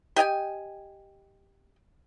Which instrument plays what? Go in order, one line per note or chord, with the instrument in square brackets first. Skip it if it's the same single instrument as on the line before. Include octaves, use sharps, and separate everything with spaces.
[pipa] G4 D#5 G5 G#5